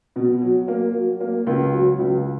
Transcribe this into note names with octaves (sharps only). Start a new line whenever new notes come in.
B2
F#3
A#3
F#3
A#3
C#2
F#3
C#2